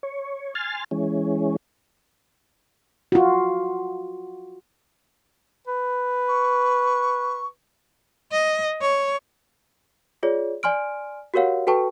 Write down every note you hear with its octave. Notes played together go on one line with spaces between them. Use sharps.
C#5
G#5 C6 F6 A6
E3 G#3 C#4
F4 F#4
B4
C#6
D#5
C#5
F4 G#4 C#5 D5
D5 G#5 C6 F6 D7
F#4 G4 A#4 C#5 F5 F#5
F#4 A4 B4 G5 A5 C#6